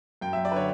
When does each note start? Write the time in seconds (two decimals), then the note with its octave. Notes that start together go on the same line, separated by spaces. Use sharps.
0.21 F#2 G5
0.33 F#3 E5
0.45 D5
0.52 D3 B4 C#5